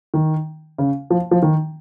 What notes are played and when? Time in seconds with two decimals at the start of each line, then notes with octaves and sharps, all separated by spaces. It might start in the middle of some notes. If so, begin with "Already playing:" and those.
0.14 D#3
0.78 C#3
1.10 F3
1.31 F3
1.42 D#3